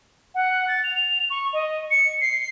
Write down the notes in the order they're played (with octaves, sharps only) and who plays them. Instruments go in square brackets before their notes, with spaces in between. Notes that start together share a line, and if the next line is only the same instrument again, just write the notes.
[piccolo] F#5
A6
F7
C#6
D#5
C#7
C7